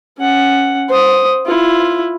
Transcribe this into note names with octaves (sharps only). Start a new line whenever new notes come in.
C#4 F#5
C5 D#6
E4 F4